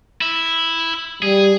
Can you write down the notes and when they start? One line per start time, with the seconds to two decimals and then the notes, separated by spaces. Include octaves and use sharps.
0.21 E4
1.22 G3 G#4